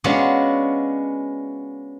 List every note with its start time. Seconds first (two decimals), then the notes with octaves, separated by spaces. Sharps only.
0.04 G#3 B3 C#4 D4 F4 F#4